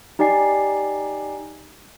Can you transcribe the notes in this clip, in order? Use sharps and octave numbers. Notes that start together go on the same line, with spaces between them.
D#4 G4 D5 G#5 C7